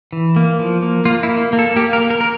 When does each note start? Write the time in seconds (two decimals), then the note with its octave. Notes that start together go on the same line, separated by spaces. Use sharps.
0.13 E3
0.36 A#3
0.59 F3
0.82 A#3
1.05 A#3 F4
1.23 E4
1.29 A#3
1.53 A#3
1.59 A4
1.76 A#3 G4
1.93 A#4
2.00 A#3
2.10 A#4
2.21 A#4